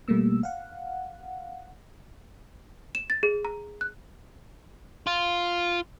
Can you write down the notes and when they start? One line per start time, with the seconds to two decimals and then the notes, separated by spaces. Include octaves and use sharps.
0.08 B2 G3 A3 A#3 E6
0.43 F5 F#5
2.95 E7
3.10 A6
3.23 G#4
3.45 A#5
3.81 F#6
5.07 F4